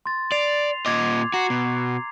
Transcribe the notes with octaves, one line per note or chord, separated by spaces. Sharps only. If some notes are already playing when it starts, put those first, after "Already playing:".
C6 A6
D5 C7 F7
A#2 D#5 D6 G#6
F#4 A#5 C7
B2